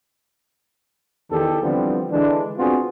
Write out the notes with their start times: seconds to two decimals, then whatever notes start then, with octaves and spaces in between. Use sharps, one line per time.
1.31 E2 D#3 G4 A4
1.63 D3 E3 F3 G3 B3 C4
2.12 D3 E3 G#3 D4
2.58 B3 C4 D4 F4 F#4 G#4